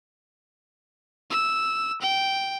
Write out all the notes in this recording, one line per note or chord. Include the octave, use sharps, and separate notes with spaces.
E6
G5